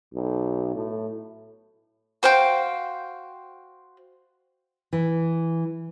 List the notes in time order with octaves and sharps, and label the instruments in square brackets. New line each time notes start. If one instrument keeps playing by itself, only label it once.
[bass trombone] B1
A2
[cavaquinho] F#4 C5 F5 G5
[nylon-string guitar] E3